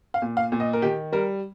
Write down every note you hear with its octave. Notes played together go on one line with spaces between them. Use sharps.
F5
A#2
F5
A#2
D#5
A#4
D#3 G4
G3 A#4